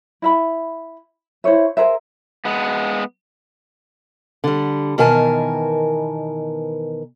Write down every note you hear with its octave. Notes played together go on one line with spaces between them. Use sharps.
E4 E5 B5
E4 C5 C#5 E5
G#4 A#4 C5 E5
G#3 B3
D3 G3
B2 D#3 E3 A#4 G#5 A5